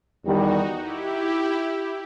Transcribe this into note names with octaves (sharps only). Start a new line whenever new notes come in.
E2 D#3 G3 D#4 F#4
E4 G4